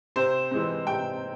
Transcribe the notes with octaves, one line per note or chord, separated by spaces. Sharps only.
C3 C5
E3 G#3 C4
C3 G5